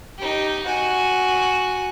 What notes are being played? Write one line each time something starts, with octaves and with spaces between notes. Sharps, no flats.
D#4 G4
F#4 G#5